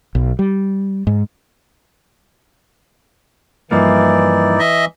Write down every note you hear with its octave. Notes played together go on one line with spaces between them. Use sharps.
B1
G3
G#2
G2 E3 F3 A#3 D#4 E4 D5
D#5 E5